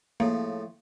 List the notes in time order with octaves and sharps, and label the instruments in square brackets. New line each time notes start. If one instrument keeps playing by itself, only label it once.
[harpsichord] A2 C#3 F3 [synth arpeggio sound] A#3